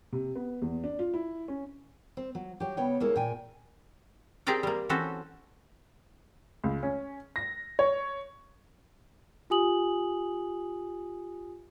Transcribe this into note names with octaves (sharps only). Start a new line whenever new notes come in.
C3
B3
E2
D4
F4
E4
C#4
C4
F#3
F#3 G4
C#3 B3 C#5 G5
D2 G#3 A#3 E4 A4 C#5
A#2 G5 G#5
C4 G4 G#4 A#4 D5 G5
G3 A#3
E3 C4 C#4 F#4 A4
C#2
C#4
A#6
C#5
F4 G4 G#5 D#6 F#7